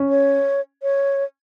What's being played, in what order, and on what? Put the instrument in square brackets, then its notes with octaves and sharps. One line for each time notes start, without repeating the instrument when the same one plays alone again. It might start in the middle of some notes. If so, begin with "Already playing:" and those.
Already playing: [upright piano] C#4
[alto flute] C#5
C#5